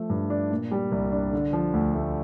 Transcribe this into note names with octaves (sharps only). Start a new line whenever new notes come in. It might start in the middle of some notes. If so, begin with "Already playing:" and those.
Already playing: F3 A3
G2
D4
A#2
G3
C2
D4
D3
F3
D2
A3